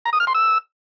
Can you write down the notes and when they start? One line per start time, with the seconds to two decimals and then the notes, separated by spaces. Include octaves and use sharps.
0.05 A#5
0.13 D#6
0.20 F6
0.27 C6
0.35 E6